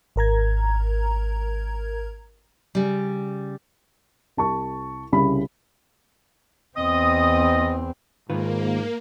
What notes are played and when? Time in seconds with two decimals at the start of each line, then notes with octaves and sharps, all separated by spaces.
0.16 G#1 A#4 A#5 G#6
2.75 C#3 G3
4.37 C2 A5 C#6
5.12 C2 C#3 B5
6.77 E2 C4 D#5 D#6
8.30 G#2 D#3 A#3 F4 B4